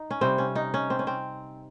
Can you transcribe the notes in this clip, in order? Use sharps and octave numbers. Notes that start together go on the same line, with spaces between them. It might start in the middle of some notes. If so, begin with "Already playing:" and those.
Already playing: D#4
C#4
C3 G3 C4
C#4
D#4
C#4
C4
C#4
C4